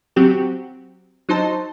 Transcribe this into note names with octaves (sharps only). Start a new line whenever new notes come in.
F#3 C4 F#4 G4
F#3 D#4 C5 A5